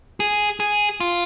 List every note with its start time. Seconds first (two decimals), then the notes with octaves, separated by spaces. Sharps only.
0.20 G#4
0.60 G#4
1.00 F4